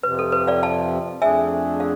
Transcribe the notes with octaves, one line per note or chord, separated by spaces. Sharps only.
F2 C3 F3 B4
A4
B4
D5 F5
F5 A5
F2 D3 A3 D4 G#4 E5 G#5
F5